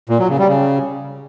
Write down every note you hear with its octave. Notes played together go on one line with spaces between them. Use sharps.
A#2
F#3
C#3
G3
C#3